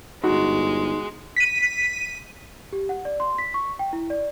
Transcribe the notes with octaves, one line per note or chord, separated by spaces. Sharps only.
G1 G#3 D#4 F#4
B6 D#7
G4
F#5
D5
C6
B6
C#6
G5
E4
D5